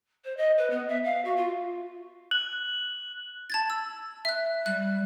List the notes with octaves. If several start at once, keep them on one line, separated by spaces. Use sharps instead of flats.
C5
D#5
B4
B3
E5
F5
F#4
F4
F#6 F#7
A5 G#6 A6
E6
E5 F#6
G3 F#6